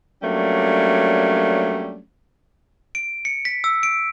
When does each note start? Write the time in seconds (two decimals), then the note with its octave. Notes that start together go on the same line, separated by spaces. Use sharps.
0.22 F#3 G3 A3 A#3 C#4 D4
2.95 D7
3.25 C#7
3.45 B6
3.64 E6
3.83 D7